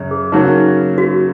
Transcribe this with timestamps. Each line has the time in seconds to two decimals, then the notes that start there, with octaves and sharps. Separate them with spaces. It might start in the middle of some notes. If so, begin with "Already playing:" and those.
Already playing: F#2 C#3 C#4
0.11 G#4
0.32 C#3 F#3 A#3 C#4 D#4 F#4
0.98 F#4